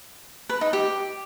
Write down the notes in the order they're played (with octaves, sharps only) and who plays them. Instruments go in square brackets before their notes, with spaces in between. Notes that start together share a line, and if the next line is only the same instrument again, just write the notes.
[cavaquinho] B4
D#4
G4